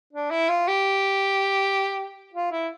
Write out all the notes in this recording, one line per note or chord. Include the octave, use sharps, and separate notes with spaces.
D4
E4
F4
G4
F4
E4